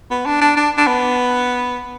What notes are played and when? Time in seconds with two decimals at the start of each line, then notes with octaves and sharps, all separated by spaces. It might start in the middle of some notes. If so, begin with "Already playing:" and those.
0.11 B3
0.26 D4
0.41 D4
0.57 D4
0.78 D4
0.87 B3